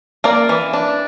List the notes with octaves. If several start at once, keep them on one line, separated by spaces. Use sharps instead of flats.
A#3 A#4 D5
E3
D4